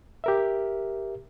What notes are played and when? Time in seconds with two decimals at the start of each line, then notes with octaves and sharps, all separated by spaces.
0.24 G4 A#4 E5